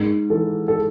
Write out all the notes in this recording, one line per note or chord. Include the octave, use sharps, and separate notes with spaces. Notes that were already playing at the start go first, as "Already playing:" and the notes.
Already playing: G#2
E3 A4
A4